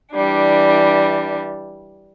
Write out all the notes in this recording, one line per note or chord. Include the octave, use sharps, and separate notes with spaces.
E3 G3 D4